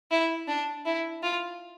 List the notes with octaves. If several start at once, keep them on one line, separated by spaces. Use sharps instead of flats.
E4
D4
E4
F4